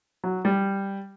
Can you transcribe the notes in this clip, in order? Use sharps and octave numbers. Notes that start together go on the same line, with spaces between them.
F#3
G3